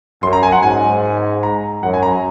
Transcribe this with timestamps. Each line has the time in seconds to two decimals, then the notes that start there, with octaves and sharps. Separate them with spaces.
0.22 F#2 C6
0.33 A#5
0.43 G#5
0.52 F#5
0.63 G#2 G#5
1.43 A#5
1.83 F#2 F#5
1.94 G#5
2.03 A#5